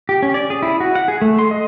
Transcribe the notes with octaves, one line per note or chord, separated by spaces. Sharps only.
G4
C#4
D5
G#4
E4
F#4
F#5
G#4
A3
C6
D#5